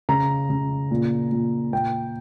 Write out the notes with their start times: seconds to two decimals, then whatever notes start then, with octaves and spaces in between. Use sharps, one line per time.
0.09 C#3 A#5
0.50 C#3
0.91 A#2
1.32 A#2
1.73 A#2 G5